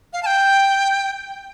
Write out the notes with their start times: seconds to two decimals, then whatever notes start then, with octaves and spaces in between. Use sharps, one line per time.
0.13 F5
0.23 A5
0.26 G5